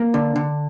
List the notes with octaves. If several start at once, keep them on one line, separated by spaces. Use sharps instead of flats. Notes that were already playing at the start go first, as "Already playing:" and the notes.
Already playing: A#3
D3
D3